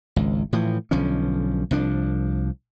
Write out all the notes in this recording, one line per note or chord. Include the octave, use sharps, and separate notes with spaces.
G#1 C#2
A2 E3 F3
B1 D3 F3 C#4
C2 F3 D4